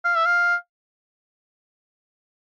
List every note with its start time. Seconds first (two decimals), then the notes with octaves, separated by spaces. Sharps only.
0.05 F5
0.15 E5
0.25 F5